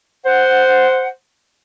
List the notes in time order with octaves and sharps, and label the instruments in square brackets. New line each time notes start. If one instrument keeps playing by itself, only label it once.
[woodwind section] C5 F#5